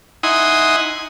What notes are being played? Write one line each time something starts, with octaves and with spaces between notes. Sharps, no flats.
D#4 E4 F#5 G#5 C6 D#6